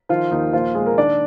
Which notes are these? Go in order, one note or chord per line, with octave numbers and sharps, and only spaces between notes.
D#3 F3 F4
D#2 D#3 D#4
A#2 F3 F4
A#2 G#3 G#4
A#3 A#4
D#3 D4 D5